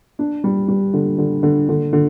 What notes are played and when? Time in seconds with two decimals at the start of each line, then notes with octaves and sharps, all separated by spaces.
0.19 D4
0.44 G3
0.68 G3
0.94 D3
1.18 D3
1.43 D3
1.69 D3
1.93 D3